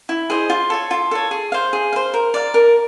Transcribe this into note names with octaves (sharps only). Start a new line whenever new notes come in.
E4
G#4 C5 D#5
F4
A4 C#5
F4
A4 C#5
G#4
C5 F5
G#4
C5 F5
A#4
D5 F5
A#4